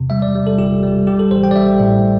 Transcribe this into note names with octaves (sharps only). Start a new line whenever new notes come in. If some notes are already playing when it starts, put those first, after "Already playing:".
Already playing: E2 C3
G3 E5
D5
G3
A4
G1 G4
G3
G3 G4
A4
A1 C5
G5
D5
G3 E5
A2